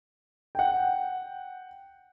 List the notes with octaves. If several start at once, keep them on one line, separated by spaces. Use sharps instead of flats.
F#5 G5